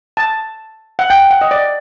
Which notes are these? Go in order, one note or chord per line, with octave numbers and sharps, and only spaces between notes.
A5
F#5
G5
F#5
D#5
D5